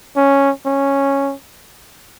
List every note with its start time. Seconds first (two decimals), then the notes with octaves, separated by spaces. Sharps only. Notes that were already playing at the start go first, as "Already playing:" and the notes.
0.16 C#4
0.66 C#4